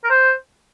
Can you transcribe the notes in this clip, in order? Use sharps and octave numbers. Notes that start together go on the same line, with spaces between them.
A#4
C5